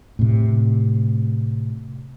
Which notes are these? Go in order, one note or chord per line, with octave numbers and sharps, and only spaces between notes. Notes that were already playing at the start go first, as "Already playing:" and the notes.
A2 C3